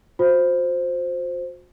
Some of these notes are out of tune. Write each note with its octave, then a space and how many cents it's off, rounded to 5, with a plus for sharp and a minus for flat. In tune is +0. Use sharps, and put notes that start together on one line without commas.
F#4 -45 C5 +0